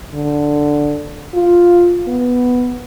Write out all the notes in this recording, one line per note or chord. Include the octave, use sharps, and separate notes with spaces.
D3
F4
B3